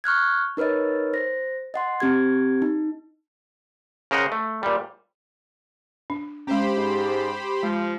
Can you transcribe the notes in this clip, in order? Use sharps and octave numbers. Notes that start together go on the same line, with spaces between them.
C#6 F6 F#6 G#6
D#4 A#4 B4 C#5 D#5
C5 A#6
D#5 F#5 C6
C4 G4 G#6
D#4
C#3 A#4 C5 D#5 F#5
A3
A#2 G3
D4
G#3 C#4 G4 C5 B5
G#2
F3 G#3